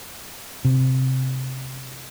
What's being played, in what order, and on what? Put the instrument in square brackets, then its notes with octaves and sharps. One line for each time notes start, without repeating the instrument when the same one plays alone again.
[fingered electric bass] C3